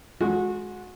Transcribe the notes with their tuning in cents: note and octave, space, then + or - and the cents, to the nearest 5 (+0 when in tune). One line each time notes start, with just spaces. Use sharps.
G#3 +15 F#4 -25